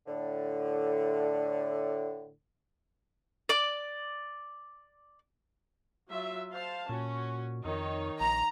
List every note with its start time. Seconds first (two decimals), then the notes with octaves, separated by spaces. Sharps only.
0.07 A2 D3
3.49 D5 D6
6.09 F#3 F4 E5
6.50 C5 F5 A5
6.89 A#2 C#4 F#4
7.65 F2 D#3 D#4 C#5
8.21 A#1 A#5